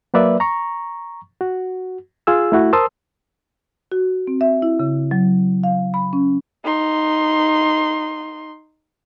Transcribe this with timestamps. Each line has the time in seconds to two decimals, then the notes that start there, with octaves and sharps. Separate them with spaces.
0.14 F#3 A#3 B4 D5 E5
0.40 A#5 C#6
1.41 F#4
2.27 F4 G#4 E6
2.52 A3 E4 F#4
2.73 A#4 C5 A5 C6 D#6 E6
3.92 F#4
4.27 C4
4.41 E5
4.62 E4
4.79 C#3
5.11 F#3
5.64 F5
5.94 B5
6.13 C#4
6.64 D#4 C6